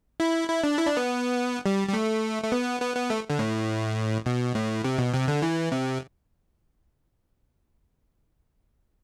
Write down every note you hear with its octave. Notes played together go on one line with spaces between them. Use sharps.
E4
E4
D4
E4
D4
B3
G3
G3
A3
A3
B3
B3
B3
A3
D3
A2
B2
A2
C3
B2
C3
D3
E3
C3